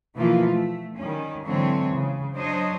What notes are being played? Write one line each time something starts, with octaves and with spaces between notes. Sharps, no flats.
B2 E3 F3 A#3 F4
A3
D#3 G3 C#4
G#2 D3 E3 F#3 C4 C#5
C#3
F#3 D4 C5 C#5 D#5